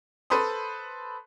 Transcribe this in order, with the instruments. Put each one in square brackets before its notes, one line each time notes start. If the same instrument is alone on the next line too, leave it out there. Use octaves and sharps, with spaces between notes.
[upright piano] A4 B4 C5 B5 C6 D#6